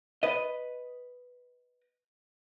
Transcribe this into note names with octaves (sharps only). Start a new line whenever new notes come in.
B4 D#5